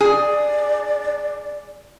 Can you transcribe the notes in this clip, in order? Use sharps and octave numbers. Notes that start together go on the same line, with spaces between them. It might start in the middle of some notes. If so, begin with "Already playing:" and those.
G#4 D5